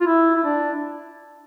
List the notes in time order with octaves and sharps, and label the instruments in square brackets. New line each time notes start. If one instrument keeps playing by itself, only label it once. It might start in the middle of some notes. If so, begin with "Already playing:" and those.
[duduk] F4
E4
E4
D4